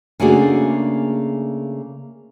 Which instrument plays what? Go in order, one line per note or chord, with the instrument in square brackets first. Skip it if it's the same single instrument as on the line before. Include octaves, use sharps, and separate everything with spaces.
[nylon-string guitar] C#3 A3 A#3 D4 F#4 G#4